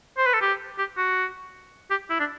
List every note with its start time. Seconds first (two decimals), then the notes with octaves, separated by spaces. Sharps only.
0.17 C5
0.26 B4
0.34 A4
0.41 G4
0.78 G4
0.97 F#4
1.90 G4
2.10 E4
2.19 D4